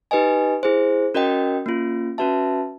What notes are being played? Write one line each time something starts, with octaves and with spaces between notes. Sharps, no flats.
D#4 G4 B4 D#5 G#5
E4 G#4 C5
C#4 F#4 A#4 D#5 G5
A#3 C#4 F4
C#4 F#4 B4 E5 A5